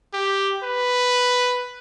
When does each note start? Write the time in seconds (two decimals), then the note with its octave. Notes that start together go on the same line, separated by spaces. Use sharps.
0.13 G4
0.63 B4